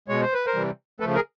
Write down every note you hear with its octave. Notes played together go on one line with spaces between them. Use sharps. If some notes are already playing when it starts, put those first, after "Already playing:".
B2 G#3 C#5
C5
B4
A#4 C5
C3 E3 G3
C#3 F3 A3 A4 B4
G#4 A#4